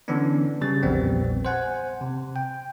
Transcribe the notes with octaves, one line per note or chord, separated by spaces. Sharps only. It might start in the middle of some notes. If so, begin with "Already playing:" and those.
D3 E3 B3 C#4 D4
C#3 G3 A6
A#1 E2 G3 B3 C4
C5 F#5 G#5
C3
G5